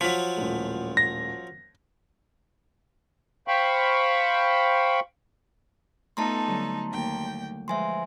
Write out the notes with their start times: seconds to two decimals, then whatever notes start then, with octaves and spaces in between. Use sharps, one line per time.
0.01 F3 F#3 B6
0.37 D#1 A2
0.97 A#6
3.48 C5 F5 G5 B5 C#6
6.17 A3 B3 D#4 F4 A4 A5 A#5 C6
6.47 D3 F#3 G3
6.90 D#2 G5
7.68 F3 G#3 B4 C5 E5 G#5 C6